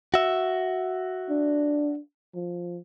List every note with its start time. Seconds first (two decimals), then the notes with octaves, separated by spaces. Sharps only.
0.14 F#4 E5
1.30 D4
2.35 F3